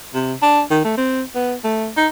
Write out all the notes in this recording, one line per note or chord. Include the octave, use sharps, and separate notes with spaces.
C3
D4
D#3
A3
C4
B3
A3
D#4